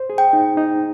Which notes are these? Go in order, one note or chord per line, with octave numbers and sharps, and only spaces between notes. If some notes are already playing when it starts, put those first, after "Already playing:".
Already playing: C5
G#4
G5
D#4
D#4